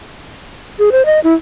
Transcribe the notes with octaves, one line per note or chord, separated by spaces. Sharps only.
G#4
C5
D#5
E4